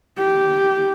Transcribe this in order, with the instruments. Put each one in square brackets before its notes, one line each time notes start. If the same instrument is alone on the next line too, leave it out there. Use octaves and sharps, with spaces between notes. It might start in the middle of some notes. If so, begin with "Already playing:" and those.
[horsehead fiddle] G4